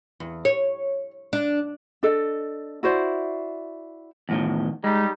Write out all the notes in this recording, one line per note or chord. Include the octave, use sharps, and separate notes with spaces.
E2
C#5
D4
D4 A4 D#5
E4 F#4 C5 D5
E2 A2 D#3
G3 G#3 D#4